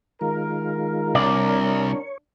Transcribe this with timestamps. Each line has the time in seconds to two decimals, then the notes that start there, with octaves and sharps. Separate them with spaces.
0.21 D#3 G#3 F4 A#4
1.15 C2 D4 C#5 D5